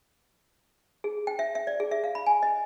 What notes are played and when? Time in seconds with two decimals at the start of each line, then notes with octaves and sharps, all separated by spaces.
1.04 G#4
1.27 G5
1.39 E5
1.55 E5
1.67 D5
1.80 G#4
1.91 E5
2.04 F5
2.15 B5
2.26 G#5
2.43 D#5